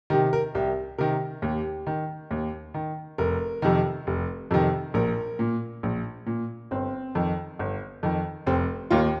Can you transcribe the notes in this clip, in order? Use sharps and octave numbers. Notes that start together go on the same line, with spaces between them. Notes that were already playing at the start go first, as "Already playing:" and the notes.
C3 D#3 G4
A#4
C2 G4
C3 D#3 A#4
D#2 G4
D#3
D#2
D#3
F1 A#4
F2 C3 D#3
F1
F2 C3 D#3
A#1 A#4
A#2
A#1
A#2
G1 C4
F2 D#3
G1
F2 D#3
F1 C4
D#2 D#3 F4